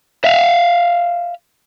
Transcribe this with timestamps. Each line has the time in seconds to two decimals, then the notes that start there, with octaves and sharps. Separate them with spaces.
0.24 E5 F5